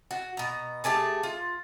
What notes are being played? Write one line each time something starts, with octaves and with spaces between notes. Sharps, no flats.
F#4
B2 A#5
A3 G4 G#4 A5
F4